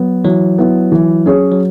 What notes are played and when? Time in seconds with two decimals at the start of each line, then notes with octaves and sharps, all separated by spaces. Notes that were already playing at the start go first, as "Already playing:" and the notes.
Already playing: F#3 B3
0.24 E3 F#3
0.58 B3 E4
0.92 E3
1.26 C#4 G#4 C#5
1.51 F#3